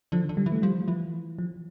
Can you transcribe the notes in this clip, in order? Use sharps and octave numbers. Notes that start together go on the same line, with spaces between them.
D3 F3
D3
G3
E3
A3
F3 G3
E3 F3
F3